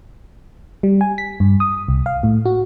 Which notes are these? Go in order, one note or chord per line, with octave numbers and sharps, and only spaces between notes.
G3
G#5
B6
G2
D#6
C2
F5
A2
F#4